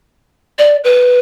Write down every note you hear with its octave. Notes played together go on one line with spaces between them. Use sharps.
D5
B4